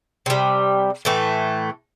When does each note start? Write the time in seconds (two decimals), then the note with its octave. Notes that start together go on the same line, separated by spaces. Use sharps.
0.26 C3 G3
1.05 A2 E3 A3